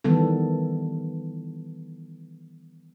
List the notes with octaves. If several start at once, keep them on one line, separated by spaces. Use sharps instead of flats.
D#3 E3 G3 B3 A4